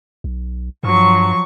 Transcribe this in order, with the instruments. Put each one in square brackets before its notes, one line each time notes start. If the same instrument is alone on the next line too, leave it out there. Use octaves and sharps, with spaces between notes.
[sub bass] B1
[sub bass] G2 [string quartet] F3 F#3 C#6